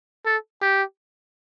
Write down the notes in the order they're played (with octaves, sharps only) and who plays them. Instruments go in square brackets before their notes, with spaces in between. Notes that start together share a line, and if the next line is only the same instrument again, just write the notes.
[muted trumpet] A4
G4